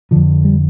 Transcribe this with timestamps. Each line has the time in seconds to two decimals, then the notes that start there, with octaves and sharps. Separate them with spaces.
0.11 F2 D3 F3
0.45 G3